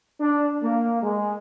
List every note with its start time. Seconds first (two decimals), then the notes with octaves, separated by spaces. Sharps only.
0.21 D4
0.63 A#3
1.03 G#3